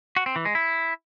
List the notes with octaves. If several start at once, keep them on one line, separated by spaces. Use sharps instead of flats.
F#4
C4
E3
G#3
E4